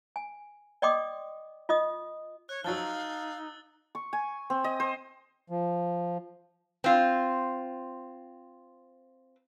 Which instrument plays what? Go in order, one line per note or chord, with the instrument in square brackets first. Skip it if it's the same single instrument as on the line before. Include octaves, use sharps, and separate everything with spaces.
[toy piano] G#5
D5 D#5 G5 C6 D6 D#6
F4 D#5 D#6
[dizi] C#5 [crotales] F#6
[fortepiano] F3 F#3 [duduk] D#4 [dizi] F5 [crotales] E6 A6 G7
[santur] C#6
G#5
C4
D#5
C5
[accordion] F3
[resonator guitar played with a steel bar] C4 F4